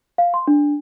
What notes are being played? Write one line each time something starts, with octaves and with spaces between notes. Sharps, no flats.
F5
C6
D4